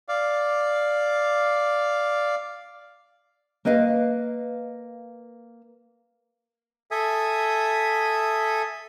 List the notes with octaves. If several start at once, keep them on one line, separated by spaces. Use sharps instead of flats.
D5 F5
A#3 B4 D#5 F5
A4 E5 G#5 D#6